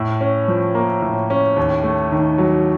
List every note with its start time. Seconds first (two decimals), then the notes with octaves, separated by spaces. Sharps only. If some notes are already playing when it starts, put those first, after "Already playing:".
Already playing: A2
0.21 C#4
0.48 F3
0.75 A#3
1.02 A2
1.30 C#4
1.56 D#2
1.84 A3
2.12 D#3
2.38 F#3